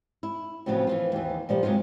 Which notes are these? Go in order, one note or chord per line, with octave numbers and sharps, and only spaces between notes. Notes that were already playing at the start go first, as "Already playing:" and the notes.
E4
A2 C#3 F3 F#3 B3 C4
E3 F3 F4
D#2 E3
A#2 F3 G3 A#3
C3 F#3 G#3 D#4 F4